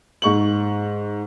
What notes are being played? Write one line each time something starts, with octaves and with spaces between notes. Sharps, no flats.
G#2 C#6 F#7